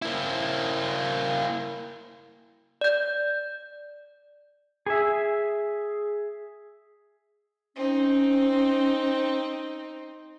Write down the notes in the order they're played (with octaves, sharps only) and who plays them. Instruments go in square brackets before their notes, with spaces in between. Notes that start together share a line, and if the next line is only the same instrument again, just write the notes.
[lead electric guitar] A#3 E4
[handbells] D5 G6
[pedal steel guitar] G#4 E5
[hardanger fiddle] C4 D#4 [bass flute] C#4